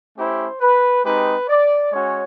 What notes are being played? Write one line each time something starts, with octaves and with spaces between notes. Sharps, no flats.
A3 C#4 E4 G4 C5
B4
G#3 C4 D#4 G4 B4
D5
G#3 C#4 F#4 C#5